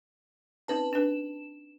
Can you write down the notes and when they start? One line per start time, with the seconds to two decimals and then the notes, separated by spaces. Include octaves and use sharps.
0.68 C4 C#4 D#4 B4 A5
0.93 D4 B4 E7